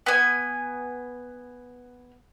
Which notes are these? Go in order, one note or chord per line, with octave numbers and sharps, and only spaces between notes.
B3 G#5